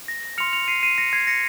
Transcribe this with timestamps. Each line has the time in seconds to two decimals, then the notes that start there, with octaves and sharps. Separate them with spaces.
0.08 A#6
0.23 A#6
0.38 C6 F6 C#7 F7
0.53 C#7 F7
0.68 C7 D#7
0.83 C7 D#7
0.98 A#6 C#7
1.13 G#6 C7
1.27 A#6 C#7